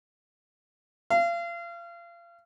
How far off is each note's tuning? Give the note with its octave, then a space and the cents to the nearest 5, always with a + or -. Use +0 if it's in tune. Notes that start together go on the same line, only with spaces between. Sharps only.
F5 -35